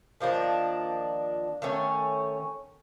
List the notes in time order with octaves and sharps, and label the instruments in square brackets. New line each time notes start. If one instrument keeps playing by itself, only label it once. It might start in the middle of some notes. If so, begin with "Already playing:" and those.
[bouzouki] D#3 F3 A#3 D4
D#3 A3 C#4